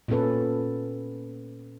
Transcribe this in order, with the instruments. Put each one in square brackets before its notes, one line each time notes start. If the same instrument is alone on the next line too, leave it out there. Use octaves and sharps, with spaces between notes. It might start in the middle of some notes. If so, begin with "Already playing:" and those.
[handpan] A#2 B3 C#4 A4 B4